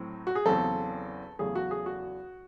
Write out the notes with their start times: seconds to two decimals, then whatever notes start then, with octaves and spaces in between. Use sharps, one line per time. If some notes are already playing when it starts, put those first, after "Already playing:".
Already playing: A2 F#3 C4
0.27 F#4
0.35 G#4
0.45 E2 C#3 F#3 C4 A4
1.39 E2 C#3 F#3 A3 G#4
1.55 F#4
1.71 G#4
1.86 F#4